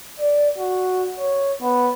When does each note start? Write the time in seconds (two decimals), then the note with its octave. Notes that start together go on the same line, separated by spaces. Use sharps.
0.20 D5
0.58 F#4
1.19 C#5
1.62 B3